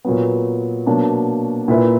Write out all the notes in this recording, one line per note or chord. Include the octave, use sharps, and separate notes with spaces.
A#2 F#3 B3
B2 F#3 A#3 D4
A#2 A#3 E4 B4 E5